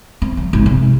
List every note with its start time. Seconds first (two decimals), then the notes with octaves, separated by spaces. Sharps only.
0.22 C4
0.37 F#3
0.53 G#1
0.66 C3